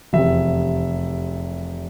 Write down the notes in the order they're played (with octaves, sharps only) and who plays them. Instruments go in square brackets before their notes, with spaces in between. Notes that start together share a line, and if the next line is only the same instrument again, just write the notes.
[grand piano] F1 E2 C3 E5